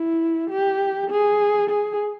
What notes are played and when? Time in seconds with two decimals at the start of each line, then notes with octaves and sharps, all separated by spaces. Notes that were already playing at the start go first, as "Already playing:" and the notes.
Already playing: E4
0.50 G4
1.10 G#4
1.70 G#4